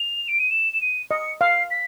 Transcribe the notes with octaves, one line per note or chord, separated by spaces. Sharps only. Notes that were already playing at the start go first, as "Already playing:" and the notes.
Already playing: F7
D7
D#7
E7
E7
D#7
D#5 C#7
F5 C7
B6